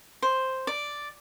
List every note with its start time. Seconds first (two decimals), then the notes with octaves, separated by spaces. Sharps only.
0.22 C5
0.67 D5